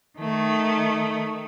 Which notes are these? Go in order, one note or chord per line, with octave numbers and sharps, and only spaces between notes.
D#3 A3